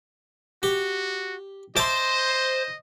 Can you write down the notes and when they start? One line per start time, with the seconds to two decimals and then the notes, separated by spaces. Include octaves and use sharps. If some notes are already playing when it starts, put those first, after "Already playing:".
0.63 F#4 G4
1.76 C5 D#5 E5 A5 C6 D6